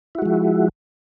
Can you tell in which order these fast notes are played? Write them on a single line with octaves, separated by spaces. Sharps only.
E4 F#4 G#3 F3